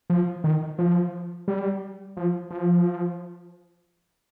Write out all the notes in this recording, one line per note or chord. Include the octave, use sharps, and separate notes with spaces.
F3
D#3
F3
G3
F3
F3